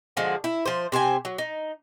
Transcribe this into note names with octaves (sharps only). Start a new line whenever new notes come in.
D3 F3 G#3 F#4
E4
F3 C5
C3 C5 G5 G#5
F#3
D#4